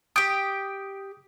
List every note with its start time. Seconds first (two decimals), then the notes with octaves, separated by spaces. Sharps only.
0.16 G4 G5 D#6